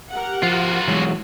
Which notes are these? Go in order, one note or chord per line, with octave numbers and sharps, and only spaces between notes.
G4 A#4 F#5
F3 F4 F#4
E3 F#3 G#3